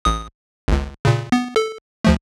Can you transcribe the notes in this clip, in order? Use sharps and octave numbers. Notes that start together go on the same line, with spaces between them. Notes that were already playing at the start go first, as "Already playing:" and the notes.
A1 D#6
G1 C#2
A#2 C#3
B3
A4
D2 F3 A3